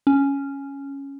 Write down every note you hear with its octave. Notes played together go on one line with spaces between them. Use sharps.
C#4